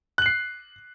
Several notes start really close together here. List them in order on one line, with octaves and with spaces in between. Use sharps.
F#6 F#7 C7